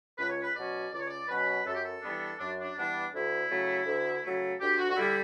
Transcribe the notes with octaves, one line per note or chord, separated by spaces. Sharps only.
C#2 B4
C#5
B4
B2 F#3 C#4 D5
C#2 D5
C#5
D5
B2 F#3 C#4 B4
F#2 A4
G4
A4
E3 G3 B3 D4
F#2 D4
D4
E3 G3 B3 D4
D2 E4
C#3 F#3 A3
D2
C#3 F#3 A3
D2 G4
F#4
F#4
D3 G3 E4